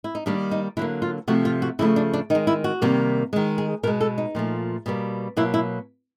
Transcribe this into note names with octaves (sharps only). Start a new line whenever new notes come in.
E4
D#4
D#3 G3 A#3 D4
D#4
D3 F#3 A#3 E4
F4
C3 F3 A3 F#4
F4
F#4
C#3 F3 A3 E4
D4
D4
D#3 G#3 D#4
E4
F#4
C3 D#3 G3 A#3
D#3 G#3
G#4
B2 G#3 A#4
A4
D#4
A#2 F3 A3
B2 G3 A#3
B2 F#3 A#3 E4
E4